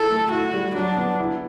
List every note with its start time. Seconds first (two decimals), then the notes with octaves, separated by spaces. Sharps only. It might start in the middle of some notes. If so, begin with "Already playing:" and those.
Already playing: E4 A4
0.09 A3
0.31 E4 F#4
0.53 G3
0.74 F#3 D4
0.96 B3
1.20 E4